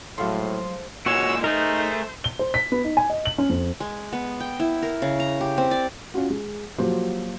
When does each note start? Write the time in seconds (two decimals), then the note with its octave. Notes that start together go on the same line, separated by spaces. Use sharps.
0.18 A2 F3 F#3 G#3 A3 F5 C6
1.06 A#2 G#3 F#4 C#5 E6
1.44 A3 D#4 G#4 A#4 C5
2.24 G7
2.39 C5
2.54 B6
2.72 B3
2.84 D#4
2.97 G#5
3.10 D#5
3.25 F#7
3.38 C#4
3.50 F2
3.80 G#3
4.13 B3
4.40 G5
4.60 E4
4.82 A#4
5.02 C#3
5.20 A#5
5.41 G4
5.58 C4
5.71 D5
6.14 C#4 F4 F#4
6.30 G#3
6.78 F3 F#3 A#3 F#4 G4 C5